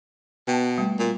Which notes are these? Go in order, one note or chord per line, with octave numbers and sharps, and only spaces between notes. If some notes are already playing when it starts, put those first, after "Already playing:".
B2 G5 A5
G3 A3
A#2